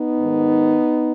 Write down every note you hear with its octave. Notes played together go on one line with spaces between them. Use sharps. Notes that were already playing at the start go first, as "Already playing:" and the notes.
Already playing: B3 D#4
G#2 D#3